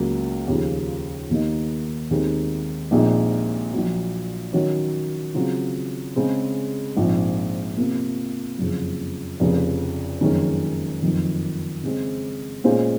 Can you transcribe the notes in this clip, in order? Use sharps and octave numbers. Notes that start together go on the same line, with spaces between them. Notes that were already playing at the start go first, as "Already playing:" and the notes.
Already playing: C#2 C#3 F#3 A#3
D#2 C#3 F3
D#2 D#3 A#3 D#4
D#2 D#3 G#3 C4 D#4
A#1 A#2 G#3 C4 D#4
A#1 A#2 F#3
D#3 F#3 C#4 F#4 C#5
C#3 F#3 C4 F4
C#3 G#3 C4
A#1 G#2 F3 C4
C3 F3 A#3
F#1 F2 C#3
F1 F2 C#3
F#1 F2 D#3 G#3 C#4
F#1 F2 D#3
C#3 G#3 C4
A#2 G#3 C#4 F4 C5